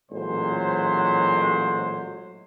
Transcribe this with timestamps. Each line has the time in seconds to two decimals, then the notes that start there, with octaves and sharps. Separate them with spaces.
0.12 A1 A#2 F#3 G#3 C5